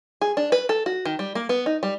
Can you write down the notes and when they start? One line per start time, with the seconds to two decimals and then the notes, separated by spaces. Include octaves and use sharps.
0.21 G#4
0.37 D4
0.52 B4
0.69 A4
0.86 F#4
1.05 D#3
1.19 G3
1.35 A#3
1.49 B3
1.66 D#4
1.83 G3